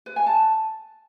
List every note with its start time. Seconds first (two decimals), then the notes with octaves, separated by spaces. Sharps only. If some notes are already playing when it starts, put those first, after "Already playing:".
0.06 B4
0.16 G#5
0.26 A5